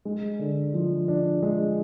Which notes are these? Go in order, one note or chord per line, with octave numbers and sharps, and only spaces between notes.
G#3
D3
F3
D4
G#3